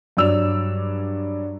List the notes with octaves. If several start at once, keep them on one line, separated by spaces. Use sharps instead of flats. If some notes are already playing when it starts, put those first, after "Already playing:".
G2 F#3 D5 E6 F7